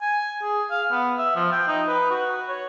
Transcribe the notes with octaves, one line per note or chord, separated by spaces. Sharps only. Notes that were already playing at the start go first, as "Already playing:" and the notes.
G#5
G#4
F5
B3
E5
F3
G5
D#4
B4
F#4
C#5